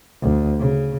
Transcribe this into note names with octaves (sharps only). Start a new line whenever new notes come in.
D2
C#3